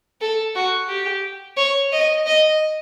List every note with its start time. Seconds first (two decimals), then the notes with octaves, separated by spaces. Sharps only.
0.21 A4
0.55 F#4
0.89 G4
1.57 C#5
1.92 D#5
2.26 D#5